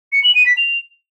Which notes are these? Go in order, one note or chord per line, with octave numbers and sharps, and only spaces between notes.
C#7
F#7
D#7
B6
F7